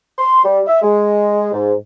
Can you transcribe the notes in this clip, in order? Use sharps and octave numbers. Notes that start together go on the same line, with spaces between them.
C6
G3
E5
G#3
G#2